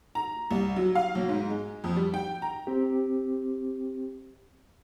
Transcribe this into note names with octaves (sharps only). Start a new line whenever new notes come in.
A#5
C2
F#3
F5
B1
G#2
G#3
F2
G3
G5
A#5
C4 G4